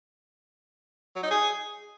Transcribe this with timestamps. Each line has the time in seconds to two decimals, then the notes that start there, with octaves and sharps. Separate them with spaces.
1.16 F#3
1.23 D#4
1.30 G#4